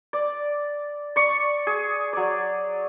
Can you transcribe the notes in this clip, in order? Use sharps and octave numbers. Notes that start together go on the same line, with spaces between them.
D5
D5 C#6
G#4
F#3 D5